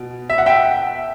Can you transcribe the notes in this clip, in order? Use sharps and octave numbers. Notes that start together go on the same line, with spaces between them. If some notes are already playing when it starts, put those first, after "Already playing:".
Already playing: B2
E5
F#5
E5 G5